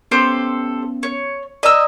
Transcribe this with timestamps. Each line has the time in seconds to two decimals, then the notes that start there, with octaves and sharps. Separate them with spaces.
0.11 B3 C#4 G4 A4 C5
1.03 C#5
1.63 D5 D#5 A#5 E6